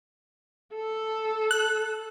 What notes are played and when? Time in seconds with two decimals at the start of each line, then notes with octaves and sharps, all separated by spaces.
0.74 A4
1.51 F#6